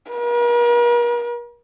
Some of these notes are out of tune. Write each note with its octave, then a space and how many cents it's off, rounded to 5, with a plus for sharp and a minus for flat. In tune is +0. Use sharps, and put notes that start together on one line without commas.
A#4 +45